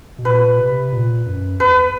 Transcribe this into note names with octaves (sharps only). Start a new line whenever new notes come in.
B2
A#2 B4
C3
A#2
F#2
E2 B4